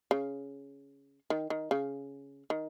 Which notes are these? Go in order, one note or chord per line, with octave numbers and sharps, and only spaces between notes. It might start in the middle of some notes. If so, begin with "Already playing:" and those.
C#3
D#3
D#3
C#3
D#3